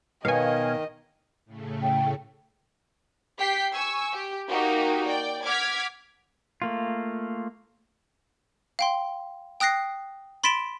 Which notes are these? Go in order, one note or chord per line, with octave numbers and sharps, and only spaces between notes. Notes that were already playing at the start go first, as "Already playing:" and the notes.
B2 D#3 C#5 D#5 F5 G#5
A2 C#3 A3
G5
G4 G5 B6 C7
G#5 C#6 E6
G4
A#3 D#4 F#4 G4 A#4
D5 G5
F#5 D6 F6 G#6 B6
A3 A#3 F4
F5 G5 C6
G5 D#6 F#6 A#6 C7
B5 C6 A6 B6 D7 E7